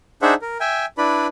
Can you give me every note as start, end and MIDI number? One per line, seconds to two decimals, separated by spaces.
0.22 0.34 62
0.22 0.34 63
0.22 0.34 68
0.22 0.34 72
0.22 0.34 76
0.22 0.34 78
0.42 0.58 70
0.60 0.85 76
0.60 0.85 79
0.60 0.85 80
0.98 1.27 62
0.98 1.27 64
0.98 1.27 71
0.98 1.27 74
0.98 1.27 83